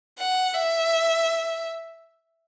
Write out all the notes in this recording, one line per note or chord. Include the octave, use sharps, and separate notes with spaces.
F#5
E5